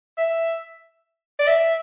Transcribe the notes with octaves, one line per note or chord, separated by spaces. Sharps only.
E5
D5
E5